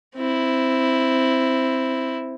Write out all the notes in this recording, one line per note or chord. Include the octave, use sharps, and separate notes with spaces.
C4 E4